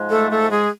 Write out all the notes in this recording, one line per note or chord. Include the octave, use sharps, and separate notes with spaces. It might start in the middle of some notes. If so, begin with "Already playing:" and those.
Already playing: G#2 F3 G#3
A3 A4
A3 A4
G#3 G#4